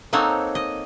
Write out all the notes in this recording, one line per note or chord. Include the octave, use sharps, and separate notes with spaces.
A#3 C4 D#4 A4 C#5 F#5
D#5